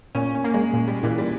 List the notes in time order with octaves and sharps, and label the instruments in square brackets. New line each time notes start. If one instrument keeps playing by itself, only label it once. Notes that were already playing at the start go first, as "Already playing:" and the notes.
[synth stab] A#2 [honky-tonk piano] C#4
[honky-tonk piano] C#4
[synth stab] A#3
[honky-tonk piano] G#3
[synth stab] A#2
[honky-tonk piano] G3
[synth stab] A#2 [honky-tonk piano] E3
[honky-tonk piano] G3